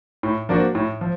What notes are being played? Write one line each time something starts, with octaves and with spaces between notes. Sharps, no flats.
A2
F3 A#3 D4 F#4
A2
F3